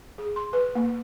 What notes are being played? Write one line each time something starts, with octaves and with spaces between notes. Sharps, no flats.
G#4
C6
B4
A#3